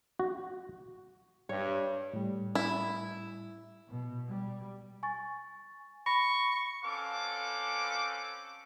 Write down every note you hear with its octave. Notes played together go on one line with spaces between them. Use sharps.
F#4
G2 C#5
A2 G3
E4
B2
G3
G#5 C#6 A6
B5 C#6 A#6
C4 C#4 A4 B4 F5 D6